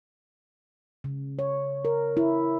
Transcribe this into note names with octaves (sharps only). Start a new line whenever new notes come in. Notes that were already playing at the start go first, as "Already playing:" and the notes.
C#3
C#5
A#4
E4